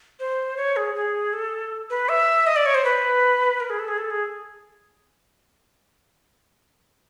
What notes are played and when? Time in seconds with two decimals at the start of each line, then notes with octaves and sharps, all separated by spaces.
0.20 C5
0.57 C#5
0.76 G#4
0.95 G#4
1.33 A4
1.90 B4
2.09 E5
2.47 D#5
2.56 D5
2.66 C#5
2.75 C5
2.85 B4
3.60 A#4
3.70 G#4
3.79 A4
3.88 G#4
3.98 A4
4.10 G#4